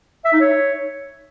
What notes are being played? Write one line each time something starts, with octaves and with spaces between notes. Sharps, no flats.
E5
D#4
C#5